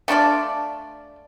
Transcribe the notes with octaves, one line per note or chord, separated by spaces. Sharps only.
A3 D4 F4 D5